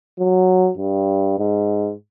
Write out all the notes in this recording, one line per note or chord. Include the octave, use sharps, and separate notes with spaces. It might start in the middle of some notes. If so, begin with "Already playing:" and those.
F#3
G2
G#2